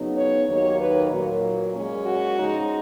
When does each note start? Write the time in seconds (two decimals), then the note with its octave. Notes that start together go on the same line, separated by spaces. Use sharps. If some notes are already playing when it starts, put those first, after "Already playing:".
Already playing: C#3 F#3 B3 D#4
0.17 C#5
0.48 D#2 D#3 F#3 A#3 D#4 C#5
0.80 B4
1.11 A#2 F#3 A#3
1.74 A#2 G#3 C#4
2.05 F#4
2.37 C#3 F3 G#3 D#4